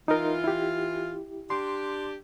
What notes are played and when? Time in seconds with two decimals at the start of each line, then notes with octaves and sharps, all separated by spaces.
0.08 E3 D#4 F4 A#4
0.44 E4 G4
1.50 D4 G4 C6